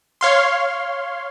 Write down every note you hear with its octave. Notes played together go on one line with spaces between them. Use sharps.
C#5 F5 C6